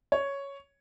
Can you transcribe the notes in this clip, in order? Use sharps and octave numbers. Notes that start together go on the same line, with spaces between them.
C#5